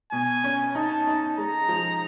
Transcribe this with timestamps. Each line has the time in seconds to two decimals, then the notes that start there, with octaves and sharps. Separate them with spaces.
0.12 B2 G#5
0.44 C#4
0.75 D#4 A5
1.07 D#4
1.38 G#3 A#5
1.69 F3